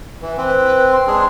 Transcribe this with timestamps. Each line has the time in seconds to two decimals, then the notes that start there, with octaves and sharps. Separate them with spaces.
0.22 E3
0.37 C4 B4
0.91 C6
1.07 G#3 D4 G#4